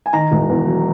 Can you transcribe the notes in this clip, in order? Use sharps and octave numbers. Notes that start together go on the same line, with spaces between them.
G#5
D#3 A#5
E1
E2
F#3